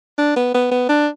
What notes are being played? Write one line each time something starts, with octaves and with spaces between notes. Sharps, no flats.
D4
B3
B3
B3
D4